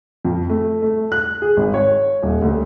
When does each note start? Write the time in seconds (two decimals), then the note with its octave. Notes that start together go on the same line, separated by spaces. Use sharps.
0.25 F2
0.50 A3
0.82 A3
1.12 F#6
1.42 G#4
1.57 G#1
1.74 C#5
2.23 D#1
2.42 D2